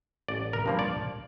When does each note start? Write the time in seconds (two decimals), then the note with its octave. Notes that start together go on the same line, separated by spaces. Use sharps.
0.28 A1 D5
0.53 A#4
0.66 G2 F3 A#3
0.79 D5